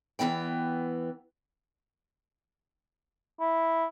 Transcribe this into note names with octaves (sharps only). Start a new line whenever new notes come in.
E2 D#3 E3 B3 G5
E4